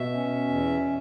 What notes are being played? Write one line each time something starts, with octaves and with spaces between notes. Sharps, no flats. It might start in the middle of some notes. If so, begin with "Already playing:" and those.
Already playing: B2 E5
C#4
E2